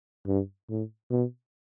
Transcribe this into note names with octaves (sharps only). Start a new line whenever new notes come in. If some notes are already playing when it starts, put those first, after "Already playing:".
G2
A2
B2